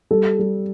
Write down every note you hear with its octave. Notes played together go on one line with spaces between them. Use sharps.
G3 A4
G3